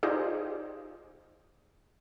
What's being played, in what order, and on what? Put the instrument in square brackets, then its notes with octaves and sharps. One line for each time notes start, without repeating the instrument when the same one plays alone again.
[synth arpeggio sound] D#4 F4 G4 G#4 C5 D5